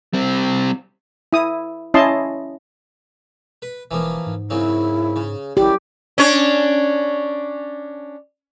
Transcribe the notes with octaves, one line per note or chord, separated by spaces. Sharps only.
G3 C4
E4 D#6
C#4 E4 D#5 A5 C6
B4
E1 E3 F3 A#3
G#2
F#2 C#3 C4 E4
C#3
G#1 F#2 E4 G4 D5
C#4 D4 C#5